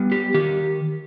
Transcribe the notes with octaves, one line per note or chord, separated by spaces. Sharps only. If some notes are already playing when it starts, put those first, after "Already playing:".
Already playing: G3 B3
G4
D#3 G4